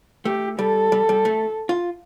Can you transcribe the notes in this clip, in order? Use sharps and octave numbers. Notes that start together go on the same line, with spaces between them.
A3 G4
G3 A4
G3
G3
A3
F4